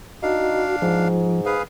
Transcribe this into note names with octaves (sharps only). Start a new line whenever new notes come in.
D4 D#4 F#4 F5
G#2 F3
G#4 B4 F5